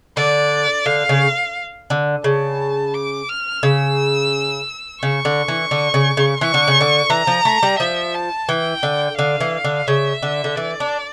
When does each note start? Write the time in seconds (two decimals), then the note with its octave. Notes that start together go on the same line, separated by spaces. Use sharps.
0.17 D3 D5
0.86 D3 F5
1.09 C#3
1.90 D3
2.24 C#3 A5
2.94 D6
3.29 F6
3.63 C#3 E6
5.02 C#3 C#6
5.25 D3
5.48 E3
5.71 D3
5.94 C#3
6.17 C#3
6.41 E3 C#6
6.54 D3
6.68 C#3
6.81 D3
7.10 E3 A#5
7.27 F3
7.45 A3
7.63 G3
7.79 F3 E5
8.15 A5
8.49 E3 G5
8.83 D3
9.18 D3 F5
9.40 E3
9.64 D3
9.87 C#3 E5
10.22 D3
10.44 D3
10.56 E3 D5
10.80 D4